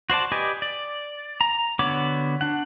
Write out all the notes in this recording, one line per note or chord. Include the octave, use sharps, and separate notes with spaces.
F#4 C5 D5 A5
G4 B4 D5 D#5 G#5
D5
A#5
D3 B3 F#4 C#5 D6
D4 F#5